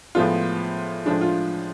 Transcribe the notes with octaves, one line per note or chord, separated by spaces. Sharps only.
A2 F3 G#3 B3 F4
A2 F3 G#3 D4
F4